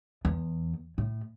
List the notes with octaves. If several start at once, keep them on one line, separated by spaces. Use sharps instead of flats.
E2
A2